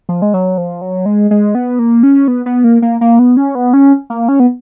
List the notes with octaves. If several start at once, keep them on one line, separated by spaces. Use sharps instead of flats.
F3
G#3
F#3
F3
F#3
G#3
G#3
B3
A#3
C#4
B3
B3
A#3
A#3
A#3
B3
C#4
B3
C#4
A#3
C#4
B3